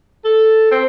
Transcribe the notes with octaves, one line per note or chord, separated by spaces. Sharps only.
A4
C4